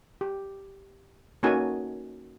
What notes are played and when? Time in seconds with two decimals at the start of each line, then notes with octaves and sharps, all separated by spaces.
0.21 G4
1.43 A#3 C#4 D#4 F#4 A4 G#5